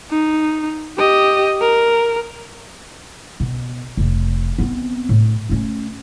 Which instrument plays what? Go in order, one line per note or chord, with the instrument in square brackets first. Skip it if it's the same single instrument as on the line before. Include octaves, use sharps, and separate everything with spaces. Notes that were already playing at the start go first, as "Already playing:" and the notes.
[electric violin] D#4
G4 D#5
A#4
[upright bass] B2
F1
B3 C4
A2
A3 C#4